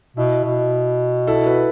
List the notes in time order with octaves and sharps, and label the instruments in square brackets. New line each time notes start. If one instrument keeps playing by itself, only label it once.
[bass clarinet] B2 [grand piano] E4
[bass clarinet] B2
[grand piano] E4 A4
F#4 B4